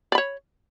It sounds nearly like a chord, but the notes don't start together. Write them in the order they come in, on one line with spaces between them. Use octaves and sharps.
D5 B5 C#5